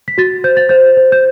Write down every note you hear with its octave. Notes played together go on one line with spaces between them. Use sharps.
B6
F#4 A6
C5 G6
A6
C5 G6
C5
G6